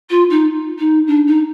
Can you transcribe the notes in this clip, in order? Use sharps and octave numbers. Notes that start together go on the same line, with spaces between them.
F4
D#4
D#4
D4
D#4